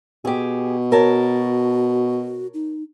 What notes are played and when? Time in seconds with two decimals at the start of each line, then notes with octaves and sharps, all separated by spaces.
0.25 B2 G4 G#4
0.92 F#4 A#4 C#5 A5
2.54 D#4